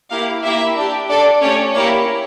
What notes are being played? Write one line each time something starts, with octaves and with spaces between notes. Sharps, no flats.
A#3 E4 G4 F5
A#3 E4 G4 E5
D4 G4
D4 A4 D5
A3 C#4 G4 C#5
A#3 E4 G4 C#5